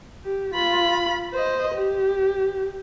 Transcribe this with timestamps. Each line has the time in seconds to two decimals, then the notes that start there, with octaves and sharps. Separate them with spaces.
0.25 G4
0.54 F4 B5
1.33 C5 D#5
1.74 G4